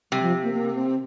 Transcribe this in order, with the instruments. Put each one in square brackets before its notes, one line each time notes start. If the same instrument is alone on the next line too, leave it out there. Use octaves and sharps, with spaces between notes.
[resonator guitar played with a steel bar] C3 [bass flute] G3
[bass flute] F3
A#3
A#3
C4